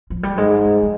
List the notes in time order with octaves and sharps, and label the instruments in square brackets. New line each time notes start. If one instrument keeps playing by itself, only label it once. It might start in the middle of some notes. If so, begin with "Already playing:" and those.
[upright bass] F3
G3
[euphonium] G#2 [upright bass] G#3
[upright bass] G3
F3